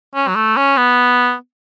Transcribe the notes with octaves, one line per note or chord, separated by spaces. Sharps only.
C#4
F#3
A3
C#4
B3